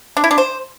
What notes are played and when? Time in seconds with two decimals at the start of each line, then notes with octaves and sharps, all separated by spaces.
0.17 D4
0.24 E4
0.31 D4
0.38 C5